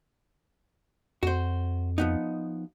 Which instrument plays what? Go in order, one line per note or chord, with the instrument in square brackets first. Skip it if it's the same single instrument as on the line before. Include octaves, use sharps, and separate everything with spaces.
[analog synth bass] F2 [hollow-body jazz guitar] F#4 C5
[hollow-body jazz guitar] F3 B3 D#4